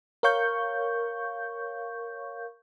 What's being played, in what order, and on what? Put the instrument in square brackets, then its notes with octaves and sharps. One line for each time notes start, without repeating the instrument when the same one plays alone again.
[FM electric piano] A#4 C#5 F5 C#6 G6